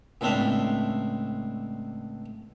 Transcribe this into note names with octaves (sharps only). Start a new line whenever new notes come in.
C#2 A2 C4 D4 E5 F5